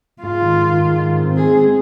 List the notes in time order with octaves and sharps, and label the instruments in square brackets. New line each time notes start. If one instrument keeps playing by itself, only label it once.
[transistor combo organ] G#2 [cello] F4
[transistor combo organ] D#3
D#3
G#2
D#3
C4
[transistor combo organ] G#3 [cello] G#4
[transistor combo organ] C4